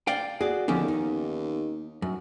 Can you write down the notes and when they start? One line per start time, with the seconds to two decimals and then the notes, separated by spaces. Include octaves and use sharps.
0.07 D5 F5 G5
0.41 F#4 G#4 D5
0.68 D#2 D3 F3 B3 C#4 G4
0.88 D#4
2.02 F#2